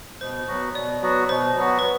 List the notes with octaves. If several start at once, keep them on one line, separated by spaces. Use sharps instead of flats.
B2 C5
F#3 B3 F#4
B2 D5
F#3 B3 F#4
B2 C5
F#3 B3 F#4
B4